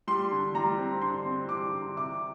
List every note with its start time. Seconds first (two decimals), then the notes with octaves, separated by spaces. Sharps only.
0.07 G3 C6
0.31 D3
0.54 G3 A#5
0.78 C4
1.02 D3 C6
1.25 C4
1.49 G3 D6
1.74 D3
1.97 C3 D6